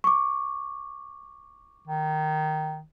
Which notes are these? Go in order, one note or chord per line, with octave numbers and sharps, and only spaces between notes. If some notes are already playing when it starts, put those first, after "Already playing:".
C#6 D6
D#3